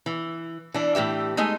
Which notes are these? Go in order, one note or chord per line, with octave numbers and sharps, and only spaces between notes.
E3
E3 D4
A2 E3 G4 E5
G#3 A3 D#4 D#5